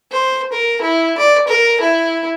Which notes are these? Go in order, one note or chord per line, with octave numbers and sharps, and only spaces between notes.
C5
A#4
E4
D5
A#4
E4